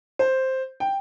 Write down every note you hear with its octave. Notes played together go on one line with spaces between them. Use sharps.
C5
G5